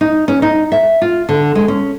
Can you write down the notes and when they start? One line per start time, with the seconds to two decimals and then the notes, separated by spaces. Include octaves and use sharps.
0.01 D#4
0.28 C#4
0.42 D#4
0.72 E5
1.02 F4
1.29 D3
1.55 G#3
1.68 C#4